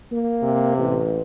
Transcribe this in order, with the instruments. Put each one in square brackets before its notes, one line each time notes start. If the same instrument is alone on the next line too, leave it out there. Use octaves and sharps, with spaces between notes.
[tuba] A#3
[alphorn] C3
[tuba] A1